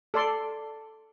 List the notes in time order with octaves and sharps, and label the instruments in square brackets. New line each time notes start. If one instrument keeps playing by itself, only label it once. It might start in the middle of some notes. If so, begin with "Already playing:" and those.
[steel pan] A4 D5 C6